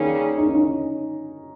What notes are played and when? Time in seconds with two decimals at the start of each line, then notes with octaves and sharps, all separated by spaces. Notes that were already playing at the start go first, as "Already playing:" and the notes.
Already playing: D#3 G3 A#3 C#4 D#4 G#4
0.38 D#4
0.46 C#4
0.55 D#4